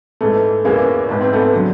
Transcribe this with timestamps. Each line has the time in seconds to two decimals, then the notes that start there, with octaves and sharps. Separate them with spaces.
0.21 G#2 E3 A3
0.64 E2 C#3 E3 G#3 A#3
1.09 G#2 E3 B3
1.21 C4
1.33 A3 B3
1.55 D3 F#3